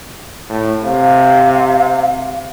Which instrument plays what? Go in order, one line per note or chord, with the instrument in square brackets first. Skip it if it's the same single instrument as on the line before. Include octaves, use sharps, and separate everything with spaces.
[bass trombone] A2
[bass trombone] C3 [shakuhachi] F5